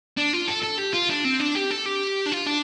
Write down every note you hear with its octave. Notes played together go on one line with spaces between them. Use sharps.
D4
F4
A4
A4
G4
F4
D4
C4
D4
G4
A4
G4
D4
F4
D4